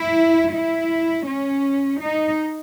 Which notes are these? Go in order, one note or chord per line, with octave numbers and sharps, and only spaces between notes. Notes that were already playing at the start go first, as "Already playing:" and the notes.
Already playing: E4
E4
C#4
D#4